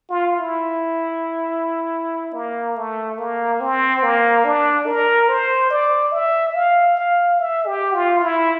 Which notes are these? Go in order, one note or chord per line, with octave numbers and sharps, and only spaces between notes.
F4
E4
A#3
A3
A#3
C4
A#3
D4
A#4
C5
D5
E5
F5
F5
E5
G4
F4
E4